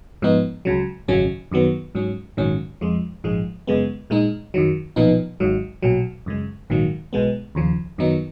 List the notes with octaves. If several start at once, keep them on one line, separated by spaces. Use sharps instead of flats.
G#2 F3 B3 D#4
C#2 C#3 F#3
G#1 F#2 C#3 F#3 C#4
F#2 D#3 F#3 B3
G#2 F#3 C#4
A#1 G#2 D#3 F#3 C#4
F2 F3 G#3
A#1 G#2 F3 G#3
F#2 C#3 G#3 B3
A#2 G#3 D#4
F#2 D#3 F#3
B1 A#2 F3 B3 D#4
G#1 G#2 F#3
B1 A#2 F#3
F#2 C#3 G#3
A#1 G#2 D#3 F#3 A#3
B1 B2 G#3 B3
D#2 C#3 F3
F#2 D#3 F#3 B3 D#4